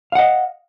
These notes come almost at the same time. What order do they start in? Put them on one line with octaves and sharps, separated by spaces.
F5 F#5 D#5